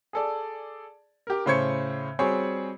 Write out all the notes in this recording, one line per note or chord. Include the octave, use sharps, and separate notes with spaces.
G#4 A4 D5
G4 A#4
A2 C#3 C5 C#5 G#6 C#7
G3 C4 F#4 G#4 C5 C#5